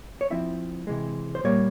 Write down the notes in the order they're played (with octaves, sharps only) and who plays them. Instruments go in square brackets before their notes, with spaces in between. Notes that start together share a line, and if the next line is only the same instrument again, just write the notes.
[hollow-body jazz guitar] C#5
F3 C4 E4 E5
C3 E3 G#3
C5
A#2 G3 A#3 C#5